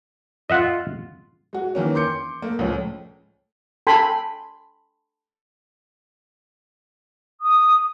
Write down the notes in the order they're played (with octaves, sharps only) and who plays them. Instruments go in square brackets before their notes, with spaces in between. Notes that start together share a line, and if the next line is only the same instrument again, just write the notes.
[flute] F4 [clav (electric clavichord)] D#5 E5 F#5
[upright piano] G#3 F#4
D#3 E3 A#3 C#4
C6 D6 G6 C#7
A3 A#3
C#2 A2 F3 C#4
[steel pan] A4 G5 G#5 B5 C6
[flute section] D#6